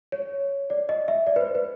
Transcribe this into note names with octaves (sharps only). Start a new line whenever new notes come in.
C#5
D5
D#5
E5
D5
B4
C5
B4